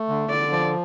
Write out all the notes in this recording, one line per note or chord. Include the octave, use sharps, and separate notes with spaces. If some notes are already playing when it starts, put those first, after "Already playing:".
Already playing: A3
D3
D3 D5
F3